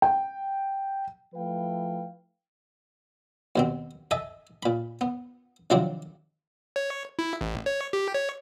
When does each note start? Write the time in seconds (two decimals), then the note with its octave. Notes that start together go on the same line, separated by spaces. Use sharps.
0.02 G5
1.34 F3 A3 E4 B4 F5 G5
3.56 D#2 B2 C4
4.11 A4 D#5 E5 G#5
4.63 A#2 B5
5.01 B3
5.70 C3 D#3 F3 F#3 C4 D4
6.76 C#5
7.19 E4
7.41 A1
7.66 C#5
7.93 G4
8.14 C#5